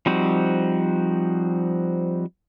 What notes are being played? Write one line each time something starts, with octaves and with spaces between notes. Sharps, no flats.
F3 G3 C4 D#4 F#4